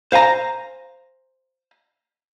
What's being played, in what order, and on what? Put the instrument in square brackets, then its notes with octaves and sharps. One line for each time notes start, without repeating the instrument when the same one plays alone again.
[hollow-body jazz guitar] C5 F5 G#5 A#5